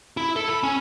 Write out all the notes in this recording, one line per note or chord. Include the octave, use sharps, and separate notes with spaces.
E4
A4
B5
C#4